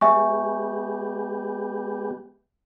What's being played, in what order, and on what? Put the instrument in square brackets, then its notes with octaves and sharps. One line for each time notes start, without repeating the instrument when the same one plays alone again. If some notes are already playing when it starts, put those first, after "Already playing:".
[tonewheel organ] G#3 B3 G4 [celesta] E5 G#5 C#6